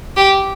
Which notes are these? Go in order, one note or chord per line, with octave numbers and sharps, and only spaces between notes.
G4